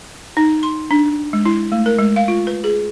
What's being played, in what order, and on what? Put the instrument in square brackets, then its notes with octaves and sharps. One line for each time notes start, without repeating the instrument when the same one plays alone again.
[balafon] D#4
C6
D4
G#3
E4
A3
A#4
G#3
F5
F4
B4
G#4